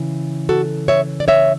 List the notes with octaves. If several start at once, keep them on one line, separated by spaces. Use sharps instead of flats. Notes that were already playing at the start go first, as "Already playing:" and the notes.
Already playing: C#3 E3
F#4 A4
C#5 E5
D5
C#5 E5